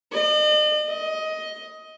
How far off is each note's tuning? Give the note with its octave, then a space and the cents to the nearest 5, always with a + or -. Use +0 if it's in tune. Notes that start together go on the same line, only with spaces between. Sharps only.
D#5 -45
D#5 +15